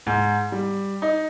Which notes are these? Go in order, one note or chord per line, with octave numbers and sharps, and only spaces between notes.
G#2
G3
D#4